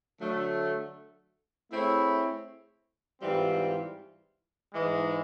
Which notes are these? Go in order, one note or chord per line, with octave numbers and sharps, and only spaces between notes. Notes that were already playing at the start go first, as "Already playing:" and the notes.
D3 F#3 A3
A3 C4 E4 G#4 C#5
G#2 E3 G3 C4 F4
G#2 E3 G#3